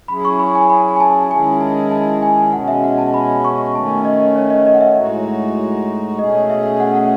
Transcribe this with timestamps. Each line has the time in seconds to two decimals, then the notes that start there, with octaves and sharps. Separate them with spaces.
0.08 F#3 C#4 E4 G#4 B5
0.25 C#6
0.39 B5
0.55 G#5
0.70 B5
0.96 G#5
1.00 A5
1.31 D#3 G#3 C#4 E4 G#4 G#5
1.61 A5
1.91 A5
2.22 G#5
2.53 B2 G#3 C#4 F#5
2.68 E5
2.84 F#5
2.98 A5
3.14 B5
3.44 C#6
3.75 D#3 A3 C#4 A5
4.05 D#5
4.36 C#5
4.50 D#5
4.67 D#5
4.74 F#5
4.81 E5
4.96 A2 G#3 D#4 F#4
6.18 B2 A3 C#4 G#4 D#5
6.50 E5
6.80 F#5
6.95 F#5